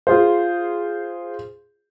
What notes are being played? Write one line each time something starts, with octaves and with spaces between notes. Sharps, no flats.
F4 G#4 C5